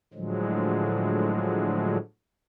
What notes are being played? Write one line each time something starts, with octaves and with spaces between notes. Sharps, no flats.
A2 D3 F3 F#3 G#3